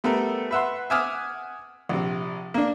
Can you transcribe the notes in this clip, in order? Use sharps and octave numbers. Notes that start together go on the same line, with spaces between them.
G3 A3 B3 A4 A#4
B4 E5 F#5 C6
E5 F#5 G#5 D6 D#6 F6
A#1 C3
A#3 D4